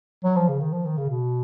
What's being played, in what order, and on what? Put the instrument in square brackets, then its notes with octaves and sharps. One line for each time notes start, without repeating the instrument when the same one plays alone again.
[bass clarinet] F#3
F3
C#3
D#3
F3
D#3
C#3
B2